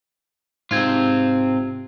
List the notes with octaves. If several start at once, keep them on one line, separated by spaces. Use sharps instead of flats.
G#2 C3 C4 F4 G#6